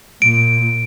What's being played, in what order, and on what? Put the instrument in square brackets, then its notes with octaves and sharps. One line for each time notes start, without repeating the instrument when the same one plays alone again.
[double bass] A#2 [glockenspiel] D7